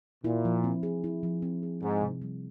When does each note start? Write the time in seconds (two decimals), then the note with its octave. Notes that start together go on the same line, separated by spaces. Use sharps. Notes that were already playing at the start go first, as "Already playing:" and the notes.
0.24 A#2 E4
0.45 F3
0.64 C4
0.83 G#4
1.04 E4
1.23 F3
1.42 C4
1.63 G#4
1.82 G#2 C4
2.01 C3
2.22 G3